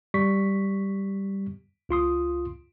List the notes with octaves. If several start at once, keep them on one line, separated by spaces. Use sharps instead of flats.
G3 C#6 B6
C#2 F4 C6 D#6